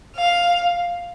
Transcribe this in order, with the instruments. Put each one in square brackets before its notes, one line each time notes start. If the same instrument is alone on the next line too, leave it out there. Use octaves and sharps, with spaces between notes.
[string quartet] F5